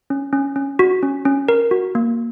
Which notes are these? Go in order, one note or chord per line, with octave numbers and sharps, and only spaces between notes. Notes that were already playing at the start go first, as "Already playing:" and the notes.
C#4
C#4
C#4
F#4
C#4
C#4
A#4
F#4
A#3